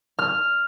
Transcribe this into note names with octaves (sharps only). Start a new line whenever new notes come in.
F6